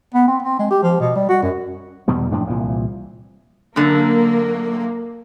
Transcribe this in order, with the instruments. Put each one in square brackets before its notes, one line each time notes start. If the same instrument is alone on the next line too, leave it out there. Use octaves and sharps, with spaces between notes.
[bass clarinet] B3
C4
C4
G#3
G4
F3
B2
G3
F#4
F#2
[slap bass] E2 B2 D#3 G3
F#2 A2 F3 D4
C2 A#2 E3 F3
[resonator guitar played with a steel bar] F#2 D3 [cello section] A#3